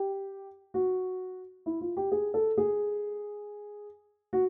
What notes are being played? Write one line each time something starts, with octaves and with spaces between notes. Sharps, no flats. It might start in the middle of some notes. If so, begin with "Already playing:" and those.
Already playing: G4
F#4
E4
F4
G4
G#4
A4
G#4
F#4